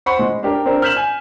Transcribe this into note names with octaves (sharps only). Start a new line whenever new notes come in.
C5 F#5 B5 C#6
G#3
D4 G4 A#4
C4 D4 A#4
F6 G6 B6 E7 F#7
G#5